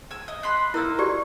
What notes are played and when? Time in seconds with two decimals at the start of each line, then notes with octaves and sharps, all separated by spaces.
0.11 G#5 E6
0.28 D#5
0.43 B5 C6 F#6
0.74 A#3 D#4 E4 A#4 E6
0.99 F#4 G4 D5 C#6